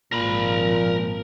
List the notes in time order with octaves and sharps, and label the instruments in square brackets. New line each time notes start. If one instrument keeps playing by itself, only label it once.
[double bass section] G#1 F3 [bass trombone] A#2 [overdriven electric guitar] A#4 B5